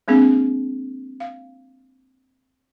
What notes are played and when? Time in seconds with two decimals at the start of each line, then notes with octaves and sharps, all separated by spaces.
0.08 G#3 A#3 C4 D4 G#4
1.20 F5